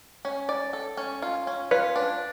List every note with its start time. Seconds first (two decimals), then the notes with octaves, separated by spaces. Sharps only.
0.25 C#4
0.49 D5
0.73 A4
0.97 C#4
1.22 F4
1.47 C#4
1.71 F4 B4 C#5
1.96 D4